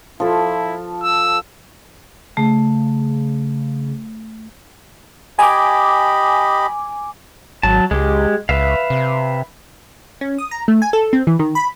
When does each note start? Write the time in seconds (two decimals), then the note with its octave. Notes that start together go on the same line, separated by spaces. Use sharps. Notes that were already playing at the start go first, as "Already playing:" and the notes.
0.20 F3 E4 A4
1.03 E6
2.37 C#3 A3
5.39 G4 D#5 G#5 B5 D6
7.63 G#1 F#3 A5
7.91 C#2 G#3 G4
8.49 C#2 B4 E5 F5
8.90 C3
10.21 C#4
10.38 D#6
10.51 A#5
10.68 A3
10.82 G#5
10.93 A4
11.13 C4
11.27 E3
11.39 D#3
11.55 B5